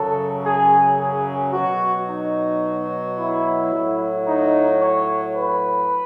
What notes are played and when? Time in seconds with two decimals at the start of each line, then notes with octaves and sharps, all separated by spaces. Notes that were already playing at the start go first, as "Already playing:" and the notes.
Already playing: F#2 C#3 F#3 A4
0.45 G#4
0.99 G#4
1.53 B2 F#3 F#4
2.09 D#4
3.17 E4
3.72 A2 F#3
4.26 D#4
4.80 C#5
5.35 B4